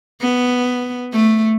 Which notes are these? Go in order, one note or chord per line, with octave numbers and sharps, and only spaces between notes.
B3
A3